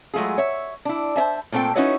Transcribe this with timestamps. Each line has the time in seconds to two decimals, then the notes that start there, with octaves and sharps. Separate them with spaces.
0.14 F#3 G#3 A3 F4 G#4
0.38 C#5 E5
0.85 D4 E4
1.16 C5 C#5 E5 A5
1.52 A#2 A3 C4 A4 G5
1.75 C#4 D#4 E4 F#4 B4 C#5